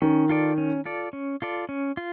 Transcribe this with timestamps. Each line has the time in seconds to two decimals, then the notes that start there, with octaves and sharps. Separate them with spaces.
0.02 D#3 C#4
0.29 F4 A4 D5
0.58 C#4
0.85 F4 A4 D5
1.13 C#4
1.42 F4 A4 D5
1.69 C#4
1.97 F4